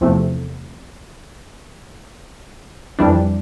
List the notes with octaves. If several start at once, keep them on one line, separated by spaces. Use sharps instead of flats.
E2 C3 F3 A3
F2 E3 G3 D4